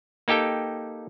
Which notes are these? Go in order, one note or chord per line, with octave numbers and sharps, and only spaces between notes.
A#3 D#4 G4 A4 G5